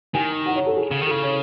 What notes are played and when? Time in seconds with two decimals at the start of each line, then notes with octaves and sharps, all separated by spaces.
0.14 D#3 G#5
0.46 F#5
0.56 C#5
0.66 A4
0.76 G#4
0.91 C#3
1.02 D#3
1.07 A4
1.11 C#3
1.23 C#5